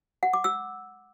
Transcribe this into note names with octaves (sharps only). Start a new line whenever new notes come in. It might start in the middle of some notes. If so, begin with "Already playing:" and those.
F#5
D6
E6